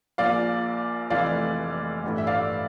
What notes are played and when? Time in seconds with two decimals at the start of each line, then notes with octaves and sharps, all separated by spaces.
0.18 A#1 A#2 F3 D5 F5
1.10 F1 F2 E3 A3 D5 F5
2.04 A1 G2 E3 A3
2.18 E5
2.27 D5 F5